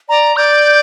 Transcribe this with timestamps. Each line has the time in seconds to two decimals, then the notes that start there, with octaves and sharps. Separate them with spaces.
0.09 D5 A#5
0.37 D5 G6